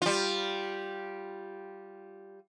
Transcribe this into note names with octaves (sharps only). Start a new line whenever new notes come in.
G3 F4